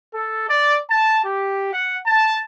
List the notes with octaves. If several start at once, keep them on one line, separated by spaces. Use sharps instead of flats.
A4
D5
A5
G4
F#5
A5